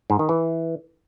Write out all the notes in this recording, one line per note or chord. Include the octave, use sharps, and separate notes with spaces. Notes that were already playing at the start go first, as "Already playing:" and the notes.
G#2
D#3
E3